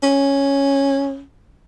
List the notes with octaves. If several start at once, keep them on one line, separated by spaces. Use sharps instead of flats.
C#4